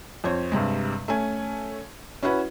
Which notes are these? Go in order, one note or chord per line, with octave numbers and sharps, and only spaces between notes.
F2 C5 C#5
G2 C3 G3 G#3
A3 C#4 G#5
C#4 E4 F#4 B4